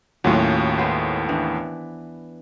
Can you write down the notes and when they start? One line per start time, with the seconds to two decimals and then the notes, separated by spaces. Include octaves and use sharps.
0.24 D#2 A2 F#3 C#4 F4
0.78 G#3 B3 C5
1.29 E3 D4